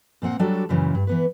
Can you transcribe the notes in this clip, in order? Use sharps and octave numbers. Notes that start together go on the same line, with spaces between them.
A#2 A#3 C4 F#5
F#3 G3 D4 F#4 A4 D5
F#2 A#2 C#3 E3 C#4
G2
E3 B3 B4